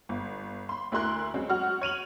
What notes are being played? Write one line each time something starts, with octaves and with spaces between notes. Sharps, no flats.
G1
B5 C6
D2 E4 A#4 C6 F#6
F#3 G#3 C4 C#4
F#3 F#4 F6
C#5 D#7 F7 F#7